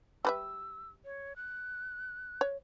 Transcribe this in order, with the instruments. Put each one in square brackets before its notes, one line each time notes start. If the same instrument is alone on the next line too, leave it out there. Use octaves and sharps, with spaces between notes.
[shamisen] G3 B4 E5 [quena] E6
[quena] C#5
F#6
[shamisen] C#5